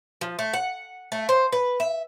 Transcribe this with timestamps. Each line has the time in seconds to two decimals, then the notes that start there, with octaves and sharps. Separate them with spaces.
0.21 F3
0.39 A3
0.53 F#5
1.12 A3
1.29 C5
1.52 B4
1.80 E5